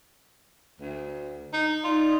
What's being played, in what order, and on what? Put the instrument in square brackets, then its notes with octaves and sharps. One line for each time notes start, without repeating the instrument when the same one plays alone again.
[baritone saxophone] D2
D#4
[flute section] D#4 D5 [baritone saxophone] F4